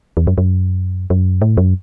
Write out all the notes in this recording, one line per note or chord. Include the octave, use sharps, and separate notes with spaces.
E2
F#2
F#2
F#2
A2
F#2